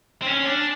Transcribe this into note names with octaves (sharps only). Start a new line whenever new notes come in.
C4
C#4
C#4
D4